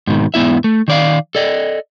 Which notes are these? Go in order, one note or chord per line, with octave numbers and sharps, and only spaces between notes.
G#2 B2 D#3
E2 G#2 B3 E4 E5
A3
D#3 D5 F5
A4 D5 D#5